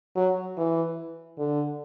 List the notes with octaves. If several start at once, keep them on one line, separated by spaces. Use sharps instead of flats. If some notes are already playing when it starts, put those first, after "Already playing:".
F#3
E3
D3